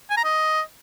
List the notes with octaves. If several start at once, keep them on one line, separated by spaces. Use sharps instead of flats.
G#5
A#5
D#5